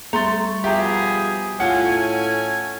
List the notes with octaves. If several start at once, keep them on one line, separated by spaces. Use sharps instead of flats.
G3 A3 A#5 C6 A6
B2 F3 G4 G#4 E5 A#5
A2 A3 C#4 F4 F#5 G#5